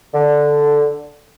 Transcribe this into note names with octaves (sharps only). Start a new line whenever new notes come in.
D3